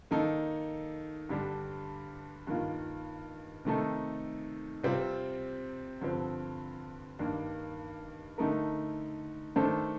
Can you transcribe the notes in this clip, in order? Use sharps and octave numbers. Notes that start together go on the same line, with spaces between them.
D#3 A#3 D#4 A4
G2 D3 G3 D4
G2 D#3 A#3 F4
C3 D#3 A3 D#4 A4
C3 G3 C4 F4 C5
G2 D3 F3 C4
G2 D#3 A#3 D4
D3 A3 D#4 A#4
D#3 A3 D4 A4 C5